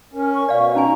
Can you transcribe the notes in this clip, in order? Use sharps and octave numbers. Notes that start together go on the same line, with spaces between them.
C#4 A#4
C#6
B2 D5 F5 C#6
C#4 D#4 G#5 A#5